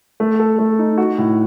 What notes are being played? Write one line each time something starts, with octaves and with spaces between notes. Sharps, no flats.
A3
A4
A3
D#4
F#4
A2